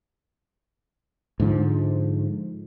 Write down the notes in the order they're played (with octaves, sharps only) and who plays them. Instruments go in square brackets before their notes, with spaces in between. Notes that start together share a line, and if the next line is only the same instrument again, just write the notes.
[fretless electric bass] G#2 D3 F3